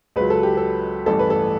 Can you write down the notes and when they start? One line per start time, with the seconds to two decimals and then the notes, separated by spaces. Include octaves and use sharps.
0.16 C#2 C#3 F#3 B4
0.30 A4
0.43 G4
0.57 A4
1.06 A1 G2 E3 A3 A4
1.19 B4
1.30 A4